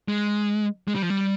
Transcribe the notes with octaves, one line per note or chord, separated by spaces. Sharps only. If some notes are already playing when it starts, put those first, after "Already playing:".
G#3
G#3
G3
F3
G3